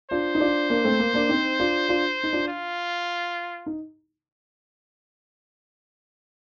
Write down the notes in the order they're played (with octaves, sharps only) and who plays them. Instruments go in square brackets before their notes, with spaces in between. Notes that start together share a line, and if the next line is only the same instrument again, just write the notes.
[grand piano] D4 F4 [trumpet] C5
[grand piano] D#4
D4 F4
A#3 D4
A3 C4
A#3
A#3 D4
C4 D#4
D4 F4
D4 F4
D#4
D4 F4
[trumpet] F4
[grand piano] D#4